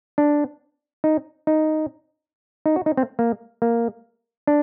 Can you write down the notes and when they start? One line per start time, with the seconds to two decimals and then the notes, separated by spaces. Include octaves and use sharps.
0.18 D4
1.04 D#4
1.47 D#4
2.66 D#4
2.76 F#4
2.86 D#4
2.97 C4
3.19 A#3
3.62 A#3
4.47 D4